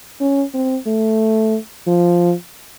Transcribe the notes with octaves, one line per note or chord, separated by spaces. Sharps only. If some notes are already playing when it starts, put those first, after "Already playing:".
C#4
C4
A3
F3